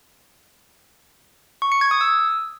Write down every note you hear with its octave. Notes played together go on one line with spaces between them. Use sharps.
C#6
C#7
G#6
D#6
E6